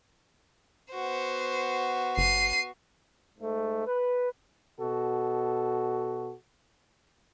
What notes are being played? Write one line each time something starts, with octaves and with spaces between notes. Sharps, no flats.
B3 F#4 C5
F#1 C7 D#7
G#2 A3
B4
B2 F#4 A4